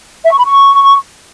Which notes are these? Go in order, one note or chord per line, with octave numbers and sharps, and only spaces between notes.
E5
C#6
B5
C#6